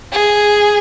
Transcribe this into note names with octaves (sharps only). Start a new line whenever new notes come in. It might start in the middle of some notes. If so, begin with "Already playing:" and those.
G#4